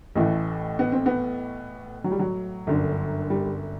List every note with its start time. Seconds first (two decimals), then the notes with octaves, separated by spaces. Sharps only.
0.15 A1 A2 E3 A3
0.79 B3
0.92 C4
1.06 B3
2.04 F#3
2.11 G3
2.19 F#3
2.67 G1 F#2 D3
3.30 G3